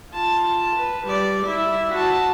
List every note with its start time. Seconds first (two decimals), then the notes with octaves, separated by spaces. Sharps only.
0.11 F4 A5
0.76 B4
1.07 G3 D5
1.46 E4 E5
1.92 F#4 A5